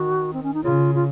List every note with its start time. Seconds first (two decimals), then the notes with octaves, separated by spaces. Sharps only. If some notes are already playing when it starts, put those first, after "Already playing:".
Already playing: D#3 F#4
0.34 C4
0.43 C#4
0.54 D#4
0.64 C#3 F4
0.95 F4